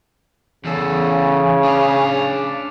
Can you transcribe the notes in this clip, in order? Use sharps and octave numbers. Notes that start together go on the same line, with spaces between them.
E2 C#3 A4
D4 F5